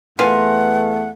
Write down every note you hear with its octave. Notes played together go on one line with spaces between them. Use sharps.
E2 A3 A#3 F4 A#4 B4 F#5 G#5